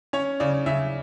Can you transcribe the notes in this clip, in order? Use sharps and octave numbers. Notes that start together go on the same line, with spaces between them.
C#4 C#5
C#3 D5
C#3 E5